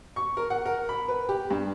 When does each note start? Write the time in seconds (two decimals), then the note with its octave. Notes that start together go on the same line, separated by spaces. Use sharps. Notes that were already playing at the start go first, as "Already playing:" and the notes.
0.16 C#6
0.37 A#4
0.50 F#5
0.66 A#4
0.89 B5
1.08 B4
1.29 G4
1.51 G2